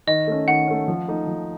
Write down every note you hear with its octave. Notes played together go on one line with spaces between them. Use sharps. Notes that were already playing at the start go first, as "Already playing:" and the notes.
D#3 D#5
A3 C#4
D#3 F#5
A3 C#4
F3
A3 D#4
F3